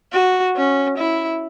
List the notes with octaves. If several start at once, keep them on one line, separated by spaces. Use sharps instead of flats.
F#4
C#4
E4